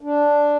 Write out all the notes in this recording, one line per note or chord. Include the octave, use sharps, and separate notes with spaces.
D4